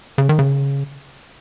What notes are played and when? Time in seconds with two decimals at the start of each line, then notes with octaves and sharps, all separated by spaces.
0.18 C#3
0.29 D#3
0.39 C#3